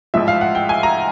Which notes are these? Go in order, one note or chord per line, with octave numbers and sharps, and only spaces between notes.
A1 G#2 F3 E5
F5
F#5
G5
G#5
A#5